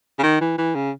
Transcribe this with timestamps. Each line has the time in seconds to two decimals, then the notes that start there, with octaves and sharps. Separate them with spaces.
0.19 C#3
0.23 D#3
0.41 E3
0.58 E3
0.75 C#3